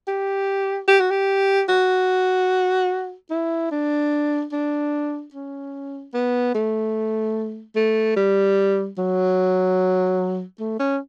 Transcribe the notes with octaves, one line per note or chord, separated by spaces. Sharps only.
G4
G4
F#4
G4
F#4
E4
D4
D4
C#4
B3
A3
A3
G3
F#3
A3
C#4